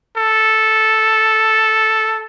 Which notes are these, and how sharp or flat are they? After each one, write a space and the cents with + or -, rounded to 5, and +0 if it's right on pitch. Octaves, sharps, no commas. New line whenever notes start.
A4 -5